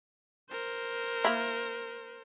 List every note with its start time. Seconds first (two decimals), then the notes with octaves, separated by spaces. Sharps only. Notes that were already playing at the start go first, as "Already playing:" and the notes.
0.50 A#4 C5
1.25 A#3 E4